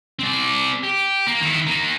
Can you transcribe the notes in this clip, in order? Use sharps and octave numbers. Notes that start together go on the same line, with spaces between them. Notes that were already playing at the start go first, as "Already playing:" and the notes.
C4 D5
G4
A#3
D#3 E4
D#3 A#3